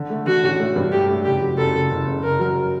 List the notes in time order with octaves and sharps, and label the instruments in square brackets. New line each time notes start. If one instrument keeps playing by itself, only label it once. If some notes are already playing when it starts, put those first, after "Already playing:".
Already playing: [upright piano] D3
A3
[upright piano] D3 [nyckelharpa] F#4
[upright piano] A1
A3
G2
[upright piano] A3 [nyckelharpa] G4
[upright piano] A3
[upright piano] F#1 [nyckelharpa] G4
[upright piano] F#3
[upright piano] F#1 [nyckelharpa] A4
[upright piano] F#1
F#1
F#1
[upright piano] F#1 [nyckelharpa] A#4
[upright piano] F#3